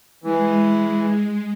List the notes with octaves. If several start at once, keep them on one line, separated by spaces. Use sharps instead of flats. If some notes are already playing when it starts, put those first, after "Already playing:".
E3 G#3